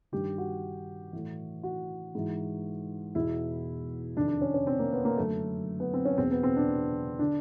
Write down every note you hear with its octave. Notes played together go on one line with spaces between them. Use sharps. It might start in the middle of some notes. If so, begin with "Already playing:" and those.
G2 D#3 G4
F#4
A2 E3
F#4
G#2 E3
E2 B2 E4
F2 C3 D#3 D4
D4
C#4
C#4
C4
A#3
B3
A#3
F#2 D3 A3
B3
C4
C#4
E2 B2 C4
B3
C4
D4
D3 D4